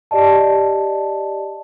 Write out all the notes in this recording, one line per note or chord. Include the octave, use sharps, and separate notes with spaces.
G4 D5 D#5 A5